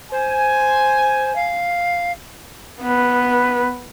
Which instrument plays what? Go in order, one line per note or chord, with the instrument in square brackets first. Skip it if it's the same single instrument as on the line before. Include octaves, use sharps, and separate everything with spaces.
[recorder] C5 [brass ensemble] G#5
[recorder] F5
[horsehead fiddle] B3 B4